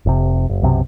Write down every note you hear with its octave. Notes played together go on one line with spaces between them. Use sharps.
F1 C3
F#1
B1 F#2 C3